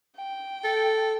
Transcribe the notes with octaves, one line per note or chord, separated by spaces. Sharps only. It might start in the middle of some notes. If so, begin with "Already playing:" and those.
G5
A4